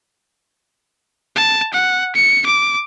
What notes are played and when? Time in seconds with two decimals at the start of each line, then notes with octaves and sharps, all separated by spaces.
1.36 A5
1.73 F#5
2.15 C#7
2.46 D6